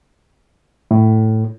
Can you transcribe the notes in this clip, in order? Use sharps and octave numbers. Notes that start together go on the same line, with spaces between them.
A2